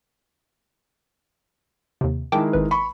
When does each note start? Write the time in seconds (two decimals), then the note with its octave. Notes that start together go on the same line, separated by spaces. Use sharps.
2.01 D#2 C3
2.32 D#3 G#3 E4 G5 A5 D6
2.53 G#1 B4
2.71 B5 C#6